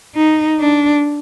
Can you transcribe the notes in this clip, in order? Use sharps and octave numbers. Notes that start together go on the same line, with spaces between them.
D#4
D4